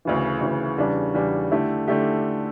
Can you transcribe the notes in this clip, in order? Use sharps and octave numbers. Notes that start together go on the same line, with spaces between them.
D2 C#3 E3
D2 C#3 E3
E2 C#3 G3 D4
E2 C#3 G3 D4
D3 A3 E4 G4
D3 A3 E4 G4